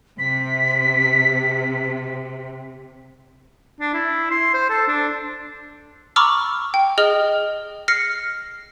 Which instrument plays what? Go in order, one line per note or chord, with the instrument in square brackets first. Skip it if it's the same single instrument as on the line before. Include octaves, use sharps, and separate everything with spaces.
[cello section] C3 [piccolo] B6
[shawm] D4
E4
C6
C5
A4
D4
[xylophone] A#5 B5 C#6 D6 E6 F6
G5
G#4 D#5 F6 G7
F6 A#6 C7 C#7